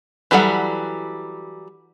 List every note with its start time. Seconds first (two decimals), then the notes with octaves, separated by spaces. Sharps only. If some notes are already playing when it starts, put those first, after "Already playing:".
0.31 E3 F#3 G3 A4 F#5